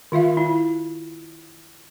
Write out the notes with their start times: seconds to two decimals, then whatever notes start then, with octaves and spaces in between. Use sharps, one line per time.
0.12 D#3 F4 E5 F5
0.37 E4